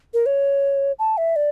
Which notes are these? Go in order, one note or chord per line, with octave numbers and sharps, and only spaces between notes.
A#4
C#5
A5
E5
D5